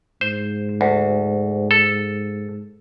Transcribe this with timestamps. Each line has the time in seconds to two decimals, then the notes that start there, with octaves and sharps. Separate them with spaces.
0.21 G#2 C5
0.81 D2
1.71 A4